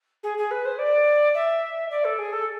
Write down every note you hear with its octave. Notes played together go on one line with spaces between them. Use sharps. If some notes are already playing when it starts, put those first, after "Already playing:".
G#4
G#4
B4
C5
D5
E5
D5
A4
G#4
A4